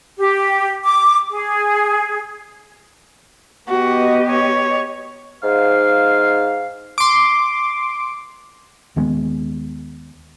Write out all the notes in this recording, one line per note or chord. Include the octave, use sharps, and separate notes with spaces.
G4
D6
G#4
B3 F#4 G4 D#5
C#5
G#2 F5
C6 D6
D#2 D#3 G#3 B3